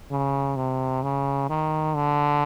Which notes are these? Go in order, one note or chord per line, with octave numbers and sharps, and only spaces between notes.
C#3
C3
C#3
D#3
D3